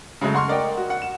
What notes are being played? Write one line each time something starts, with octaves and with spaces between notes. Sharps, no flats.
C#3 F#3 G#3 A3
F#5 C6 C#6 F6
A#4 D5 D#5 F#5 G5
F#4
F#5
E7